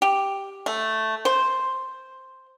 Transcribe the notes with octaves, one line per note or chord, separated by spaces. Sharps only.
G4
A3
C5